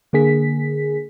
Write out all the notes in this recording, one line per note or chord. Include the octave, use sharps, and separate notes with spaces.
D3 A#3 G#4 B6